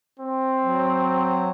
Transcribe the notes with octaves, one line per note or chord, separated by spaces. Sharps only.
C4
F#3